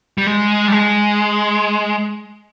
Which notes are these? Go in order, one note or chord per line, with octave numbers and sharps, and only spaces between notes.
G3
G#3
G3
G#3